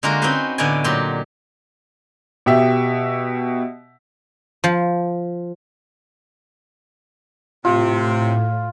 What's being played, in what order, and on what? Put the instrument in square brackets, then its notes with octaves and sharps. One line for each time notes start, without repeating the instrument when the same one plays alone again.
[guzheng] D3 G#3 A#3 F4 F#4 A#4
C4 C#4 D#4 F#4 B4 C5
A2 D3 B3 D#4 D5 G#5
A#2 F#3 G4 C6
[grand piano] B2 G4 E5
[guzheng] F3
[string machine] A2 [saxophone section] C3 [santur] F4